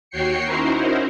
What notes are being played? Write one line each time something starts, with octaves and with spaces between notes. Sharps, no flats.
D#2 F#4 C#5 G5 C7 C#7
C#4 D#4 E4 F#4 A#4 C5